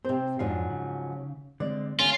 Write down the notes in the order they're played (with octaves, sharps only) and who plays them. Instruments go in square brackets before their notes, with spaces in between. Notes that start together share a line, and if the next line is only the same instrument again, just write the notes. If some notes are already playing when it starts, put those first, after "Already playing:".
[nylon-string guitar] C3 C5 [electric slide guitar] C4
[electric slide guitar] F2 D4 F5 [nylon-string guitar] G#2 F3 F#3
[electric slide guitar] C#3
[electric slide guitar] D3 G#3 C4 [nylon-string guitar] D5
[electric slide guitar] D3 A3 [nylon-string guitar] C#4 [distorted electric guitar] F4